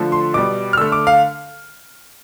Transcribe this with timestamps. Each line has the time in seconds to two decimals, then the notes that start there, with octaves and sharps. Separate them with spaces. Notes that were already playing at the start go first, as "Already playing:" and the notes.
Already playing: D3 F3 A3
0.12 C6
0.34 B2 G3 D6
0.73 F6
0.77 D3 A3 E6
0.92 D6
1.07 F5